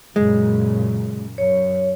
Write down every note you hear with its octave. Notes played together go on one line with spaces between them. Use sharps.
F#2 A#2 C#3 G#3
F#2 C#5